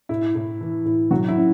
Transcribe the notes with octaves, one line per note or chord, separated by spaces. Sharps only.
A2 E4
A2
E3
A2
F#3 F#4
E4
C#4